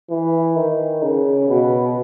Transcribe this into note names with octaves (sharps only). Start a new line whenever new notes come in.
E3
D#3
C#3
B2